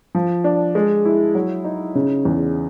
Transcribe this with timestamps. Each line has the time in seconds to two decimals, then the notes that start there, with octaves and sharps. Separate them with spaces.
0.15 F3
0.44 D4
0.75 G#3
1.05 E4
1.35 F#3
1.64 D#4
1.95 C#3
2.25 E2